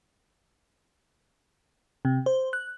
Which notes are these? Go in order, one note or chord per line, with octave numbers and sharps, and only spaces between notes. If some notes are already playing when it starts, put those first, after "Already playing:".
C3
C5
F#6